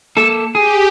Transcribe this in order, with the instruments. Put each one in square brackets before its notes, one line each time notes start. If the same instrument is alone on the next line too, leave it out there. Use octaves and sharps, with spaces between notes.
[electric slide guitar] A#3 A4
[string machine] G4 [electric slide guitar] G#4